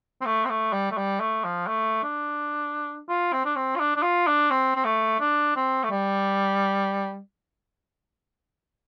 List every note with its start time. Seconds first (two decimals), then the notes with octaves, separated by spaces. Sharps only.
0.21 C4
0.26 A3
0.45 C4
0.50 A3
0.73 G3
0.91 A3
0.98 G3
1.20 A3
1.45 F3
1.68 A3
2.03 D4
3.09 F4
3.33 C4
3.46 D4
3.56 C4
3.76 F4
3.80 D4
3.96 D4
4.03 F4
4.27 D4
4.51 C4
4.76 C4
4.85 A3
5.20 D4
5.56 C4
5.84 A3
5.91 G3